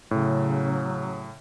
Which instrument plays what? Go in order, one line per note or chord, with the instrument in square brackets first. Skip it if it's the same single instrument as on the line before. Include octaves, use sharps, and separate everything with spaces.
[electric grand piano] A2 [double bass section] C#3 [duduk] F#3